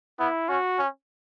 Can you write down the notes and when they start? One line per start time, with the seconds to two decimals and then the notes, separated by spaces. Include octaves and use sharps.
0.20 B3 E4
0.49 C#4 F#4
0.79 C#4